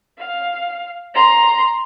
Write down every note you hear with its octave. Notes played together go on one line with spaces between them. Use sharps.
F5
A#5 C6